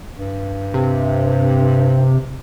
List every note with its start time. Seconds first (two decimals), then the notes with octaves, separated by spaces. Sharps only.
0.17 G2
0.74 C3